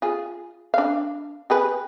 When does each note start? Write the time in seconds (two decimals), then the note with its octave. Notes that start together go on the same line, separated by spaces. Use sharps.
0.02 F4 G#4
0.74 D4 F5
1.50 G4 G#4 B4